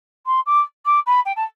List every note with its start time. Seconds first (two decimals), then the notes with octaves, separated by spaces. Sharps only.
0.26 C6
0.46 D6
0.86 D6
1.06 B5
1.26 G5
1.36 A5